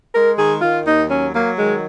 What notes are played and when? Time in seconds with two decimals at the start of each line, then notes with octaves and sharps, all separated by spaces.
0.14 G#3 A#4
0.37 D#3 G#4
0.62 D#3 F4
0.86 D#2 D#4
1.09 F#3 C#4
1.34 F#3 A#3
1.57 D#3 G#3